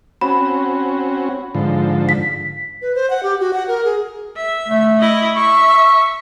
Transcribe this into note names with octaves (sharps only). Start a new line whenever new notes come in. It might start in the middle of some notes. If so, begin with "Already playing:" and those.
C4 C#4 F#4 B5
G#2 D3 F3
B6
B4
C5
F#5
G4
F#4
F#5
A#4
G#4
E5
A3
E4 D#5
E5 C#6